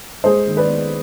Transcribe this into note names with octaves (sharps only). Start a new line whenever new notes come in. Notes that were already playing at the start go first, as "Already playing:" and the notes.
G#3 G#4 C5
D#3
B4 D5
B3